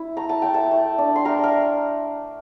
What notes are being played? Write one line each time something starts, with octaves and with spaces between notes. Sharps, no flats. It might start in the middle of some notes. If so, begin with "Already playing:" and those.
Already playing: E4
A3 A#5
A5
A3 G5
A4 A5
A3
D4
C6
A3 A#4 A#5
A#4 A#5